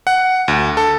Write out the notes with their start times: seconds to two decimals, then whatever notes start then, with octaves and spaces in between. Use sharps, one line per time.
0.07 F#5
0.48 D2
0.77 A4